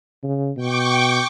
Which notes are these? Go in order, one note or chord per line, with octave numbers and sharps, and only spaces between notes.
C#3
B2 G5 C#6 D6